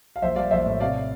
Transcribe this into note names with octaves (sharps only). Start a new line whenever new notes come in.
F5
A#1 C5 E5
G3 D5 F5
A#1 C5 E5
A2
C3 D5 F5